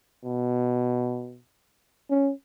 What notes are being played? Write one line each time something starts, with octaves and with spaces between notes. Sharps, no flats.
B2
C#4